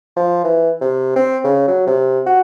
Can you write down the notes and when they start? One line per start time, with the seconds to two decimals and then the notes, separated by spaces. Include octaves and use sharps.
0.16 F3
0.44 E3
0.81 C3
1.16 C4
1.44 C#3
1.68 F#3
1.87 C3
2.26 F#4